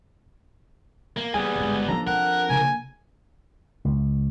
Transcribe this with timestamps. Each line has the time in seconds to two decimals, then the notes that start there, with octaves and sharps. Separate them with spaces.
1.17 A#3
1.34 G3 A#3 B3 G#4 G#5
1.56 G1 G#2
1.88 F3 D4 D#4 A4 A#5
2.07 C4 A#4 F#5
2.49 C#3 A#3 G#5
3.85 C#2